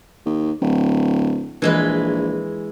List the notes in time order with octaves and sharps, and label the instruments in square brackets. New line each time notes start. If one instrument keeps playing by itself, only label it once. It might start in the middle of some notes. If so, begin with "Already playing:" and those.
[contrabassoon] D#2
D1
[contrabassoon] A#1 [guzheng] E3 G#3 B4